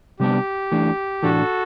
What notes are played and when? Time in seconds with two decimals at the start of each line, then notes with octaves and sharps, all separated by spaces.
0.20 C3 G3 B3 D4 G4
0.72 E3 A3 D4
1.23 A2 E3 A3 D4 F#4 A4